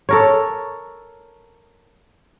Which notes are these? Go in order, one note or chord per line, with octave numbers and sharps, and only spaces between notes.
A4 A#4 C#5